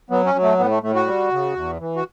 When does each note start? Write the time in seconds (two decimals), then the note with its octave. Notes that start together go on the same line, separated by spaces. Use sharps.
0.10 F#3 B3
0.26 C#4
0.34 F#3
0.42 A3
0.59 A2 B3
0.70 A3
0.82 A2 A3
0.95 F#4
1.07 G3
1.32 C#3
1.55 E2
1.80 E3
1.96 F#4